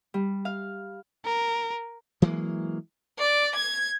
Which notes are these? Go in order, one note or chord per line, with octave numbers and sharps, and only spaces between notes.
G3
F5
A#4
E3 F#3 G#3 A#3
D5
G#6